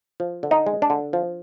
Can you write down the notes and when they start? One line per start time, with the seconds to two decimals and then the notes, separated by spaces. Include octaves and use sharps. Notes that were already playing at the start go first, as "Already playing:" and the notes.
0.20 F3
0.43 D3
0.51 D#4
0.67 G#3
0.82 D4
0.90 D3
1.13 F3